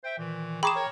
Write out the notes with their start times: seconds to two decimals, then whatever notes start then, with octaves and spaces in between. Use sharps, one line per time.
0.04 C5 E5 G5
0.18 A#2 D#3 E3
0.63 G#4 G5 A#5 B5 C#6 D6 E7
0.76 A#4 C#5